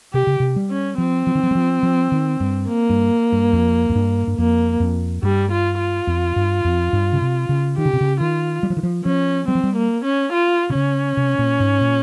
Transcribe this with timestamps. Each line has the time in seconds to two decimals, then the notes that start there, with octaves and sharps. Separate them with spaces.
0.13 C3 G4
0.27 C#3
0.40 C3
0.56 G3
0.70 C#4
0.98 F3 C4
1.27 F3
1.35 D#3
1.43 F3
1.51 G3
1.55 F3
1.83 F3
2.12 D#3
2.40 G2
2.68 A#3
2.90 G2
3.32 G2
3.53 F2
3.89 F2
3.95 G2
4.27 G2
4.38 F2 A#3
4.80 F2
5.23 G2 G3
5.51 F4
5.79 F4
6.07 F2
6.36 G2
6.65 F2
6.93 G2
7.13 C#3
7.22 C3
7.49 C#3
7.77 D#3 G4
7.85 C#3
7.93 C3
8.01 C#3
8.20 D#3 F4
8.63 G3
8.70 F3
8.77 D#3
8.83 F3
9.05 F3 C#4
9.48 G3 C4
9.55 F3
9.64 G3
9.76 A#3
10.04 C#4
10.32 F4
10.70 C3
10.75 C#3 C#4
11.17 C3
11.39 A#2
11.60 G#2
11.81 A#2